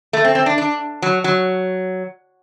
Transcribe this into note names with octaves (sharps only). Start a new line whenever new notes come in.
A3
C4
C4
D4
D4
F#3
F#3